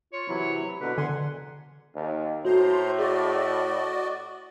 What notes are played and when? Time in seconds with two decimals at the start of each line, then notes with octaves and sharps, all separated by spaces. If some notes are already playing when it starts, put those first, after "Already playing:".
0.13 F4 C#5
0.28 C3 E3 F#3 E4
0.81 B2 D3 A#4 B4
0.98 D3 F#5 G#5 C6
1.95 D#2
2.45 A2 F#4 C5 A#5 C6
2.99 F#4 G#4 D5 D#5